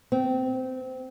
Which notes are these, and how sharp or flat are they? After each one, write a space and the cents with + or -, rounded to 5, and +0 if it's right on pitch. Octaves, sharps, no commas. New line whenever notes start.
C4 -20